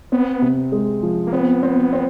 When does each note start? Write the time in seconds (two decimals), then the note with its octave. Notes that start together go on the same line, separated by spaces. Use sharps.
0.12 B3 C4
0.42 C3
0.72 G#3
1.03 F3
1.27 A#3
1.33 B3 C4
1.63 C4
1.93 C4